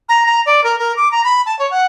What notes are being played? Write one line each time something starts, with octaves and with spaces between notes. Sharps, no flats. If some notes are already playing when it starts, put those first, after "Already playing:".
A#5
A#5
D5
A#4
A#4
D6
A#5
B5
A5
C#5
F#5